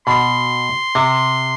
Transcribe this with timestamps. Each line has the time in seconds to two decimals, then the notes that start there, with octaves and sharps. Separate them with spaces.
0.07 B2 C6
0.95 C3